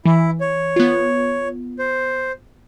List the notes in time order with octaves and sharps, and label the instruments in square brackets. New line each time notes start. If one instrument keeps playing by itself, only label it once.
[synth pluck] E3 [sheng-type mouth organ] E4
[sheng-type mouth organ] C#5
[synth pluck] B3 F4
[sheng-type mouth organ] C5